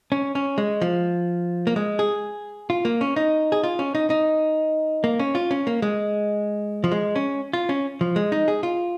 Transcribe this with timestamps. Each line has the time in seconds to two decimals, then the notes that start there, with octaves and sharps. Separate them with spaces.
0.12 C#4
0.35 C#4
0.58 G#3
0.81 F3
1.67 A#3
1.76 G#3
1.99 G#4
2.70 F4
2.85 A#3
3.01 C#4
3.16 D#4
3.52 G#4
3.63 F4
3.79 C#4
3.95 D#4
4.10 D#4
5.04 A#3
5.19 C#4
5.35 F4
5.51 C#4
5.67 A#3
5.82 G#3
6.84 F3
6.92 G#3
7.16 C#4
7.53 F4
7.69 C#4
8.01 F3
8.16 G#3
8.32 D#4
8.48 G#4
8.63 F4